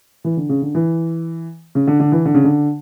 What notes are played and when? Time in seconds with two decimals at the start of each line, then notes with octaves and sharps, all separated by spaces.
0.24 E3
0.37 D3
0.49 C#3
0.62 D3
0.75 E3
1.75 C#3
1.87 D3
2.00 D3
2.12 E3
2.25 D3
2.34 C#3
2.44 D3